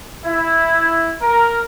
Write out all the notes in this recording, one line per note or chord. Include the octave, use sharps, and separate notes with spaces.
E4
A#4